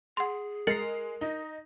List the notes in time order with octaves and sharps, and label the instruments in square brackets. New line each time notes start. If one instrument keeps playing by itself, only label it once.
[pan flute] G#4 [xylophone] F#5 C6
[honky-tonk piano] G#3 C7 [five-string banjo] A#4 [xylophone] A6 C#7 F#7
[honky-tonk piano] D#4 [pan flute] D#5